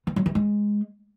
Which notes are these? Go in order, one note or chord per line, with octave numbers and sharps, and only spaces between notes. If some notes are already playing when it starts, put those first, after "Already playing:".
E3
F#3
E3
G#3